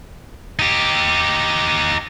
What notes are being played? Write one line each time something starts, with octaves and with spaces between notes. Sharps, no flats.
D#4 G4